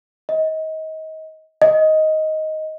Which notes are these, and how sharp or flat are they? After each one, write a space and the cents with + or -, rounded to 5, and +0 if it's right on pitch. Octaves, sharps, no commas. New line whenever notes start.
D#5 +25
D#5 +10